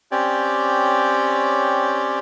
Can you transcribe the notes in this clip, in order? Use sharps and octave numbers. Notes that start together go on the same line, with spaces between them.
C4 C#4 G4 C#5 D5